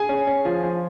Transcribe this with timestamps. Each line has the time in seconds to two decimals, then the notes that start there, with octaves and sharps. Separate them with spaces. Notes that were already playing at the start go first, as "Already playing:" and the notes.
Already playing: G#4 G#5
0.09 C#4
0.27 C#4
0.45 F3
0.63 F3